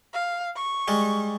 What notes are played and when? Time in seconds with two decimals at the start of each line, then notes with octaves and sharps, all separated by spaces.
0.13 F5
0.56 C#6
0.88 G3 G#3